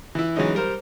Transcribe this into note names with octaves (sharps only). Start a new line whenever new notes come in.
E3 E4
E3 F#3 G#3 C#4 D#4
G3 A#4 C5